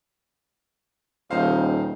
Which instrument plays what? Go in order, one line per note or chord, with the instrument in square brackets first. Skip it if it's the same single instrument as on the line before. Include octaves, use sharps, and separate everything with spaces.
[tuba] D#1 [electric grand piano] D#4 C5 F5